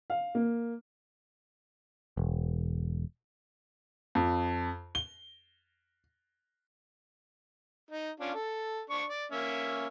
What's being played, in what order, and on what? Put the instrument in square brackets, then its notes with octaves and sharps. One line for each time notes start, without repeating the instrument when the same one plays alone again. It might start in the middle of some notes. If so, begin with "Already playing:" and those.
[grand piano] F5
A#3
[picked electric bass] E1
[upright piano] F2
G7
[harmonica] D#4
C#4 D4 F4
A4
D4 C#6
D5
A#3 C#4 E5